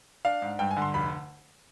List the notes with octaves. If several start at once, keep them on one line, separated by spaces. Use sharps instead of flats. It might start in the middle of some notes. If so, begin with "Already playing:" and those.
D4 F5
G#2
G2 G5
G#5
D3
C6
F1 B5